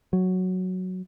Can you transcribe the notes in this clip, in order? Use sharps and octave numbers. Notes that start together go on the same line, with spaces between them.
F#3